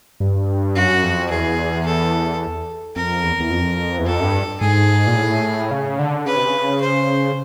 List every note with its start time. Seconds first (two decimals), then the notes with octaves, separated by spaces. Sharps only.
0.20 G2
0.76 F#2 F#4
1.03 F2
1.30 E2 G#4
1.86 A4
2.96 F2 A#4
3.24 E2
3.40 E2
3.51 F2
3.99 E2
4.06 F2 A4
4.20 F#2
4.24 G2
4.61 G#2 G#4
5.07 A#2
5.16 A2
5.71 C#3
5.99 D3
6.26 C#3 B4
6.36 C3
6.47 C#3
6.81 C5